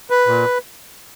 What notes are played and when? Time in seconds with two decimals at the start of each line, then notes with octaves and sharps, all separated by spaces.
0.10 B4
0.27 A#2